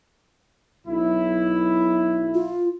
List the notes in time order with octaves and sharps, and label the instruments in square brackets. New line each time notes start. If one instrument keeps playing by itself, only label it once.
[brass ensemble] B1 E4
[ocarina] F4